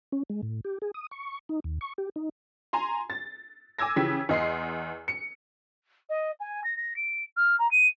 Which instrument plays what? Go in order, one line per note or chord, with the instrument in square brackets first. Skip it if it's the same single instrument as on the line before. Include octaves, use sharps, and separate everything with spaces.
[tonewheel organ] C#4
G#3
A2
G4
G#4
D#6
C#6
D#4
D#2
C#6
G4
D#4
[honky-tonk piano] G#5 A#5 C6
A6
G#5 D6 E6 G#6 A#6
C#3 E3 F3 G4 G#6 B6
E2 D#5 C6 C7
C#7
[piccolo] D#5
G#5
A#6
A#6
D7
F6
A#5
D#7